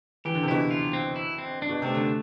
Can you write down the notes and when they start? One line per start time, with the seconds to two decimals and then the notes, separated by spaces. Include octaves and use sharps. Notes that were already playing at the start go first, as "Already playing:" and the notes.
0.25 E3 G4
0.34 D3
0.43 C3
0.48 B2 D3 E4
0.71 F4
0.93 C4
1.16 E4
1.38 C4
1.62 D4
1.69 B2
1.82 C3 A3
1.95 D3